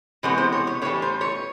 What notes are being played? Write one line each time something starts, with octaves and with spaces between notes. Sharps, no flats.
C3 E3 G#3 B3 C#5
C5
C#5
C#5
A2 E3 G3 C#5
C5
C#5